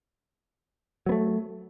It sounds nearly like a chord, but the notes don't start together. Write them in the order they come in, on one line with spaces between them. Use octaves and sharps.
F#3 B3 A3